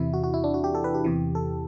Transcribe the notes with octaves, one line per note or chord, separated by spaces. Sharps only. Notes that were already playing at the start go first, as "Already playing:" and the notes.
Already playing: E2 C3 E3 E4
F#4
F#4
E4
D4
F#4
G4
A4
B4
G4
E2 C3 E3
A4